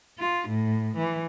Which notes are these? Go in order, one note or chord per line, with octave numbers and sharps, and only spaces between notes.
F4
A2
E3